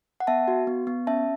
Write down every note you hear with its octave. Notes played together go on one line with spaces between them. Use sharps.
F#5
B3 E5 A5
F#4
B3
B3
C#4 E5 A5